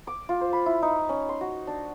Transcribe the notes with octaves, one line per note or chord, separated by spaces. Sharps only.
D6
F4
C5
B5
E4
D#4
C#4
C6
F#4
D4